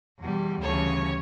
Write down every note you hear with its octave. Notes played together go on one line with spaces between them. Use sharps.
E2 B2 G3
D2 C#3 E3 G3 C#5